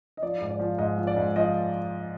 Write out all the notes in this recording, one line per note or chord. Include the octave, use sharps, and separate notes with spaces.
D#5
F3 D5
G#2
D5
F3
G#2 D#5
F3
D5
G#2
F3 D#5